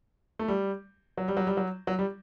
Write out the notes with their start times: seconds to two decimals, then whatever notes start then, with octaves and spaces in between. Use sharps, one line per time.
0.39 A3
0.48 G3
1.18 F#3
1.28 G3
1.37 F#3
1.47 G3
1.57 F#3
1.87 F#3
1.99 G3